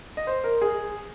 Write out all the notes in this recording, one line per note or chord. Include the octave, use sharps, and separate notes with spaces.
D#5
C5
A#4
G#4